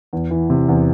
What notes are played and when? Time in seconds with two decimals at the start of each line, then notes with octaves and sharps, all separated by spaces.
0.13 E2
0.31 E3
0.50 C3
0.69 E2